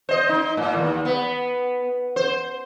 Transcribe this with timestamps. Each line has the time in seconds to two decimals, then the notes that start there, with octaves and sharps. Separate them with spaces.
0.09 C5 D#5
0.29 D#4
0.57 A2
0.76 D#2
1.05 B3
2.16 C5